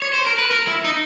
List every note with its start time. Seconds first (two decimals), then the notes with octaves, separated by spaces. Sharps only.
0.02 C#5
0.14 C5
0.26 A#4
0.39 B4
0.51 A#4
0.68 E4
0.84 D#4